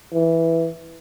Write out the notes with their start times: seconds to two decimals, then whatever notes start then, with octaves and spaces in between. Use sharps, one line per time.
0.13 E3